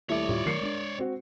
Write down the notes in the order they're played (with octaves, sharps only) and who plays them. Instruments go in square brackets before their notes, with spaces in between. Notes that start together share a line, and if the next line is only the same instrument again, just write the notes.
[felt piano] D#1 A3 E4 [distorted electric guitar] C#5 D5
[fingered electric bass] D2 A2 [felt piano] G3 E4 F4
[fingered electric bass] D#3 F#3 A3 [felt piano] A#4 C7 C#7
[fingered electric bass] G#3 C#4 D4
[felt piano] C4 F#4